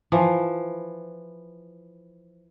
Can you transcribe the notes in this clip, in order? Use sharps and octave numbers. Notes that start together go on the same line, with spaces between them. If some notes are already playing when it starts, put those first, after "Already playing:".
E3 F3